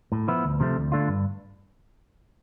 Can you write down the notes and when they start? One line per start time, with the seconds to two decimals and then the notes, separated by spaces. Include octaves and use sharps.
0.12 A2
0.28 F3 B3 E4
0.44 D2
0.60 C3 F3 A3
0.76 D2
0.92 D3 A3 D4 F4
1.08 G2